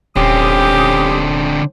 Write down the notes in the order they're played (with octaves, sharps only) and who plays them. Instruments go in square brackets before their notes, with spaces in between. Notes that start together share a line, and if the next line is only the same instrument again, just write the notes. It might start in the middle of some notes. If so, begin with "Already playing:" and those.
[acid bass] D#1 [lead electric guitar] D3 C4 [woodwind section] C#4 D#6 [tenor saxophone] G4